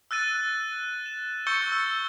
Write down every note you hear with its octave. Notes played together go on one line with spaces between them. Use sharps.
E6 F#6 A6 D#7
E7
C#6 E6 G6 A6 C#7 G7
E6